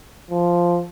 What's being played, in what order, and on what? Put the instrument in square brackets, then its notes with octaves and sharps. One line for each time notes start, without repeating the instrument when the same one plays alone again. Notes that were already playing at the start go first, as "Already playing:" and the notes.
[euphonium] F3